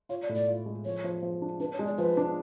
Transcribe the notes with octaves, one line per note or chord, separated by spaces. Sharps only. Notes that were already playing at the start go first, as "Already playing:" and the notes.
F4 C#5
D5
A2
D5
F4
G#3
F3 C#5
F3
F3
D4
D4 B4
C#5
G#3
D5
F3 B4
D4